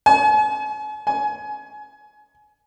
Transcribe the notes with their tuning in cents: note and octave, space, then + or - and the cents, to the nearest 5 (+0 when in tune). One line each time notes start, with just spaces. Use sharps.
G#5 +45
G#5 +25